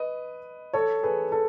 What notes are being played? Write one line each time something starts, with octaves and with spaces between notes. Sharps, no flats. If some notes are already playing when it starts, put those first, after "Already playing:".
Already playing: B4 D#5
A4 C#5
G#4 B4
A4